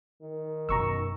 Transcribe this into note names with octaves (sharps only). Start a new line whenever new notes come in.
D#3
F#2 B2 A#5 C#6 E6